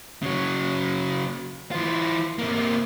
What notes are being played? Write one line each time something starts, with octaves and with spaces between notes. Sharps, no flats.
C#3 F#3
E3 F4
C3 A#3